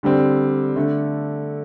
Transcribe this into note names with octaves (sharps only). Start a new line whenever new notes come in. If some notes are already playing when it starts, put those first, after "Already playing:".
D3 G3 C4
D3 A3